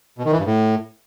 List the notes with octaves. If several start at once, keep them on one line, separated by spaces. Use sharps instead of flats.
B2
D#3
E3
G2
A2